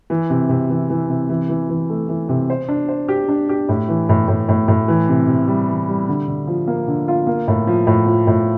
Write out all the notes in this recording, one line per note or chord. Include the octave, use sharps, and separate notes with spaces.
E3
C3
C3
E3
E3
C3
E3
E3
E3
A3
E3
C3
C5
D4
C5
G4
D4
G4
A2
E3
A2
A2
A2
A2
E3
C3
C3
G3
E3
G3
D3
D3
F3
A#3
D3
F4
A#3
A2
F3
A2
F3
A2